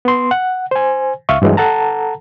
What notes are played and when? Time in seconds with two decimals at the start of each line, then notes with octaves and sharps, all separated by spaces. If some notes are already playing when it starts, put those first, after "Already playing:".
0.05 B3 C6
0.31 F#5
0.71 C5 G#5
1.29 C#2 E5 F5 C#6
1.42 G2 E3 F#3 G#3
1.57 A4 F#5 A5 A#5